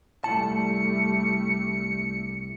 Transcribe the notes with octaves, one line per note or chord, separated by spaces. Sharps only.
C2 G3 A3 E4 A5 C#7